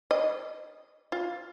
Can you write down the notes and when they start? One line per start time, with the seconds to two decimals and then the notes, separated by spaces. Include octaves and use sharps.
0.11 D#5
1.12 F4